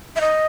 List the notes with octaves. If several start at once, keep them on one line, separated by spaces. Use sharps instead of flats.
E5
D#5